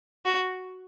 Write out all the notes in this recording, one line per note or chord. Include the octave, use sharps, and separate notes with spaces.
F#4